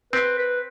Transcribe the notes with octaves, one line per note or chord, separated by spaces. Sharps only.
C4 B4
B4